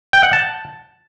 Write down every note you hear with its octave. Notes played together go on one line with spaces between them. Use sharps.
G5
F#5
A5